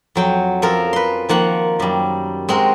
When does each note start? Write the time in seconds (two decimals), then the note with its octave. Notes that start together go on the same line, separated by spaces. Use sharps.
0.15 F2 F#3 G5
0.62 F3 C#4 A4 A#4
0.93 B4 C6
1.29 D#3 F3 A#3 F#5
1.80 F#2 G3
2.49 G#3 C4 F#4 A#4